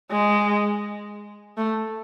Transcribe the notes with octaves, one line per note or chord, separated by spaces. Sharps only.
G#3
A3